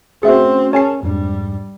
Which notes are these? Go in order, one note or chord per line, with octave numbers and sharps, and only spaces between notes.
A3 C4 C#4 F#4 G#4 E5
C#4 G#4 A#4 C#5 G#5 A5 C7
F2 G#2 G3 D4